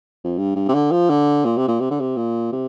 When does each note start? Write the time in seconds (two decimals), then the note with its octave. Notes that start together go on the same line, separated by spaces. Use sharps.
0.24 F2
0.38 G2
0.56 G2
0.68 C3
0.74 D3
0.91 F3
1.10 D3
1.45 A#2
1.57 C3
1.67 A#2
1.80 C3
1.90 D3
2.00 C3
2.16 A#2
2.52 C3